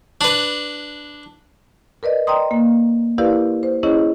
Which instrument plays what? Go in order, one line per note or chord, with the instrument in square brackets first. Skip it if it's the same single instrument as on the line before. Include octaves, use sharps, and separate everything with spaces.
[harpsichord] D4 B4
[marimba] A#4 B4 D5 D#5
D5 D#5 G5 A#5 C6 D#6
A#3
E4 G4 A#4 B4 D5 F5
C5
C#4 E4 G#4 C#5 D#5